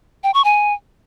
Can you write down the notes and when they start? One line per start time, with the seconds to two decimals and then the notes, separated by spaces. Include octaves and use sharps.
0.24 G5
0.34 C#6
0.45 G#5